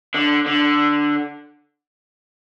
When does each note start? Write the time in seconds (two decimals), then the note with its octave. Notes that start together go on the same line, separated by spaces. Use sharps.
0.14 D3
0.46 D3